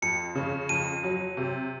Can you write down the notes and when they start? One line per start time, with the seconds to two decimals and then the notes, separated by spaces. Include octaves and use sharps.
0.02 F2 C#7
0.35 C#3
0.69 F2 D#7
1.04 F#3
1.37 C3